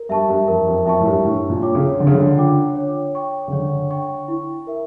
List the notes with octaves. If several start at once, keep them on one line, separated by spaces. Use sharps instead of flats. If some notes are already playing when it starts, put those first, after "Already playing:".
Already playing: A#4
G2 E5 A5 C#6
G2
F2 A#4
F2
F2 E5 A5 C#6
A2
G2
A2 D4
A#2
F4 C#5 G5 D6
C#3
D3 D4
C#3
D3
F4 C#5 G5 D6
C#5
G5 C#6
C#3
D3 C#5
G5 C#6
E4
A#4 E5